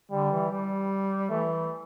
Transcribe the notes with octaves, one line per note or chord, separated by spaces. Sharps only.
D3 G3
E3
G3
E3 A3